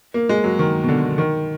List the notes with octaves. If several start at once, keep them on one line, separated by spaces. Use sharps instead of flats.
A#3
G#3
F#3
D#3
B2
D3
D#3